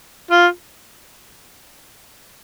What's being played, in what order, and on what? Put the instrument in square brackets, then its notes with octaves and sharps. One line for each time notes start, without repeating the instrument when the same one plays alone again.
[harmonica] F4